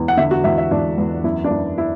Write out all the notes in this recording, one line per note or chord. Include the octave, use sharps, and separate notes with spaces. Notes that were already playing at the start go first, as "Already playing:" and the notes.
Already playing: E2
F#5
D3 E5
F#4
E2 E5
E5
E2 D4
E2
F#2 E4
D4
F#2 E4
E4